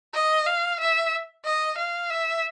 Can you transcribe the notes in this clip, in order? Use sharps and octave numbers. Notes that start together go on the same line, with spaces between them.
D#5
F5
E5
D#5
F5
E5